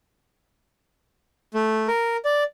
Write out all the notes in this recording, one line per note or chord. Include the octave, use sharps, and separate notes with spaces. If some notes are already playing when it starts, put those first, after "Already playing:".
A3
A#4
D5